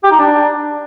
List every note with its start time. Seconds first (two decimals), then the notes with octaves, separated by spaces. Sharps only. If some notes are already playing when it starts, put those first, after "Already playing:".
0.03 G4
0.11 D#4
0.19 D4